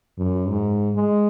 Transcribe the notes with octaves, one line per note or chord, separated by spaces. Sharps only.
F#2
G#2
G#3